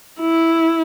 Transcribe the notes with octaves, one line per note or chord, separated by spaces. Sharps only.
E4